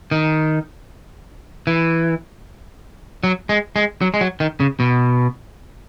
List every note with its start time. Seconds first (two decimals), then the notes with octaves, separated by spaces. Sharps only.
0.11 D#3
1.67 E3
3.24 F#3
3.49 G#3
3.76 G#3
4.01 F#3
4.14 G#3
4.21 F#3
4.40 D#3
4.60 C#3
4.80 B2